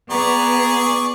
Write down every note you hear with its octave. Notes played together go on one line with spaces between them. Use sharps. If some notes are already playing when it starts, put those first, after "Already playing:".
B3 G#4 D5 A#5 C#6